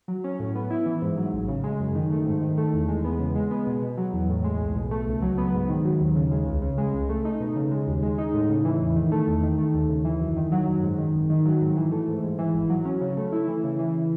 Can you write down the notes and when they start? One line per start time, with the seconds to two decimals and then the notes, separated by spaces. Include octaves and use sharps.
0.08 F#3
0.24 C#4
0.40 A2
0.55 B3
0.70 E4
0.86 E3
1.02 G#2
1.17 F#3
1.33 A1
1.48 C#3
1.64 G#3
1.80 F#2
1.95 D#3
2.10 A3
2.26 G#2
2.41 D#3
2.57 A3
2.73 E2
2.88 G#3
3.04 B3
3.20 C#3
3.35 G#3
3.51 B3
3.66 B2
3.82 B2
3.98 F#3
4.13 E2
4.29 A2
4.44 G#3
4.60 B1
4.76 B2
4.91 A3
5.07 C#2
5.22 F#3
5.38 B3
5.53 G#2
5.69 D#3
5.85 F#3
6.00 D#2
6.16 C#3
6.31 G#3
6.47 C#2
6.62 C#3
6.78 G#3
6.94 C#2
7.09 A3
7.25 D#4
7.40 B2
7.56 C#3
7.71 G#3
7.87 D#2
8.03 G#3
8.18 D#4
8.34 A2
8.49 C#3
8.65 E3
8.80 E2
8.96 D#3
9.12 A3
9.27 E2
9.43 D#3
9.58 A3
9.74 D#2
9.89 C#3
10.05 E3
10.21 F#2
10.36 D#3
10.52 F#3
10.67 F#2
10.83 G#2
10.98 D#3
11.14 G#1
11.30 D#3
11.45 F#3
11.61 G#2
11.76 E3
11.92 A3
12.08 G#2
12.23 G#2
12.38 E3
12.54 G#1
12.70 F#3
12.85 C#4
13.01 C#3
13.17 A3
13.32 E4
13.47 E3
13.64 C#3
13.79 E3